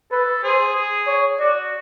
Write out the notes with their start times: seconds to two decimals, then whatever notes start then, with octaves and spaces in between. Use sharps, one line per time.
0.11 A4 B4
0.43 G#4 C5
0.76 G#4
1.07 C#5
1.40 F#4 D5